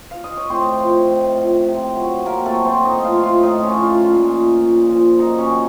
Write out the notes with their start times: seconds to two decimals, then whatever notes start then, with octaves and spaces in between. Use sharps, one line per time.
0.11 F5
0.24 D#5
0.37 C#5
0.50 A2 C4 C5
0.79 F3
1.09 A2
1.38 F3
1.67 C3
1.96 F#3
2.26 C3 A#3 A#4
2.45 A3 A4
2.55 F#3
2.65 C4 C5
2.84 A2 D#4 D#5
3.04 F4 F5
3.14 F3
3.23 F4 F5
3.43 A2 D#4 D#5
3.62 C#4 C#5
3.73 F3
3.82 F4 F5
4.01 A#2
4.31 F3
4.61 A#2
4.90 F3
5.19 F#2 D#4 D#5
5.38 C#4 C#5
5.48 D#3 F#3